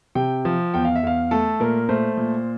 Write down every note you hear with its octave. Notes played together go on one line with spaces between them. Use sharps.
C3 G5
F3
E2 G5
F5
E5
E2 F5
A3 A4
A#2 A#4
A3 C5
A#2